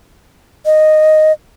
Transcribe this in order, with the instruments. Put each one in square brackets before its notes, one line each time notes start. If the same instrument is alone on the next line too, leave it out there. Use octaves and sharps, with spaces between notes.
[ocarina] D#5